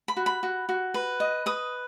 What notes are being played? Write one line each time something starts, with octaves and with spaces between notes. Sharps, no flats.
B5
F#4
B5
F#4
F#4
B4
D#5
B4 D#6